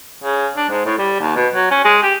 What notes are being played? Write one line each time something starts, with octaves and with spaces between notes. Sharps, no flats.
C#3
D4
G#2
A2
G3
D#2
B2
F#3
C#4
G#3
G4